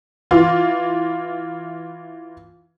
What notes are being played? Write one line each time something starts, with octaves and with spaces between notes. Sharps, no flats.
E3 F4